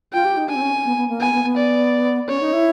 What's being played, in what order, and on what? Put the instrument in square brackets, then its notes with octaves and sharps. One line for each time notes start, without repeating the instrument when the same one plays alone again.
[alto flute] F4 [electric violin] G5
[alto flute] G4
D#4
[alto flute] D4 [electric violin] G#5
[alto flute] C4
C#4
B3
B3
A#3
[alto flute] B3 [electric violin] G#5
[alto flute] B3
B3
[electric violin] D5
[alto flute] C#4 [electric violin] C#5
[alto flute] D#4
E4